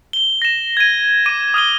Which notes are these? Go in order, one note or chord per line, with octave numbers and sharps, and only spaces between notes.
G7
A#6 E7
G#6 D#7
D6 D#7
D#6 F6 D#7 G7